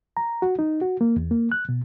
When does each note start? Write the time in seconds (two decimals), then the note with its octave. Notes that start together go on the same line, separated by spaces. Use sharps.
0.17 A#5
0.42 F#4
0.59 D#4
0.81 F#4
1.01 A#3
1.16 E2
1.31 A#3
1.52 F#6
1.69 B2